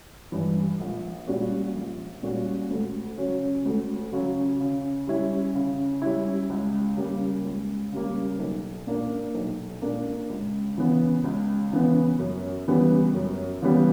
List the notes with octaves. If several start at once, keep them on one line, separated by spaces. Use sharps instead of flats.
G2 E3
A#1
A#2 G3 C#4 F#4
A#1
A#2 G3 C#4 F#4
D2
C#3 F#3 C#4
D2
C#3 F#3 C#4
C#3
G3 C#4 E4
C#3
G3 C#4 E4
C#2
C#3 G3 A#3
C#2
C#3 G3 A#3
B1
A#2 A#3 D4 A#4
B1
A#2 A#3 D4 A#4
C#2
C#3 E3 B3
C#2
C#3 E3 B3
F#2
C#3 E3 G3 B3
F#2
C#3 E3 G3 B3